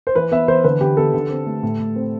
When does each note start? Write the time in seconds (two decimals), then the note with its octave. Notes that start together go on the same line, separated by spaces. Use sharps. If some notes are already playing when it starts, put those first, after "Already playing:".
0.07 C5
0.15 E3 B4
0.31 B3 E5
0.48 E3 C5
0.64 D3 B4
0.81 D3 G4
0.97 B3 A4
1.14 D3
1.30 C4
1.46 A3
1.63 A2
1.80 A2
1.96 C4